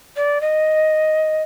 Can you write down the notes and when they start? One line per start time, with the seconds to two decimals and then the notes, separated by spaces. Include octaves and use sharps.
0.16 D5
0.41 D#5